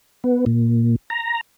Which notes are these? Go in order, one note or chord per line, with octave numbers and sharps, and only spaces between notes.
B3
A#2
A#5